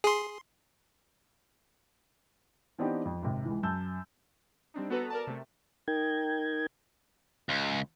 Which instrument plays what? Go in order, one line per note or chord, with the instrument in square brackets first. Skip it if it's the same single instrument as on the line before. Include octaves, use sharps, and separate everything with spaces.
[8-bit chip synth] G#4 C6
[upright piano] E3 B3 C4 D4 D#4 G4
F2
G#1 C3
C#2 E3
F#2 A5 E6 G6
[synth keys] G3 C4 D4 D#4
B3 F#4 A4 B4 A#5
A#4 D5 A5
C3 A3
[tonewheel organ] D#4 A#4 G5 G#6
[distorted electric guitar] C#2